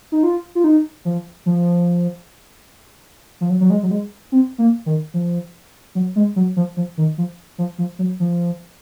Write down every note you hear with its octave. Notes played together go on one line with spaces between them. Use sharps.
D#4
F4
F4
D#4
F3
F3
F3
F#3
F#3
G#3
F#3
G#3
C4
A#3
D#3
F3
F#3
G#3
F#3
F3
F3
D#3
F3
F3
F3
F#3
F3